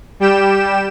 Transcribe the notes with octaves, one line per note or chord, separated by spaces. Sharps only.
G3 G4 G5 E7